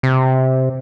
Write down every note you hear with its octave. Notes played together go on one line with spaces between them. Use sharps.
C3